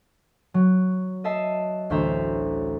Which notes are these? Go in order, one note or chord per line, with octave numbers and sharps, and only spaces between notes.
F#3
D#5 E5 A5 C7 D#7
A1 D2 C5 E5 A#5